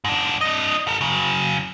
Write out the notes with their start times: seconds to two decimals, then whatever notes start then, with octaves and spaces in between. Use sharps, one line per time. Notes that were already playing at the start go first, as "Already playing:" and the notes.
0.05 G#2 D4
0.41 D4 D#5
0.88 A4 A#4
1.01 C#3 F#3